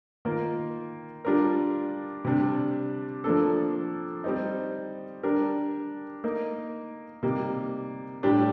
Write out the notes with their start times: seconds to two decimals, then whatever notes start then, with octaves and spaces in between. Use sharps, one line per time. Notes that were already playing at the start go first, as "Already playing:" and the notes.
0.25 D#3 A#3 F4 A#4
1.25 G3 D4 F4 A#4
2.25 C3 G3 D4
3.24 F3 A#3 D4 A4
4.24 G3 C4 D#4
5.23 G3 D4 G4 A#4
6.24 A#3 D#4 A#4
7.23 C3 G3 A#3 D#4
8.23 A2 G3 D4 G4